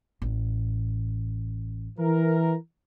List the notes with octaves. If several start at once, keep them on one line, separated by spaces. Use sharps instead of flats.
A1
E3 A#4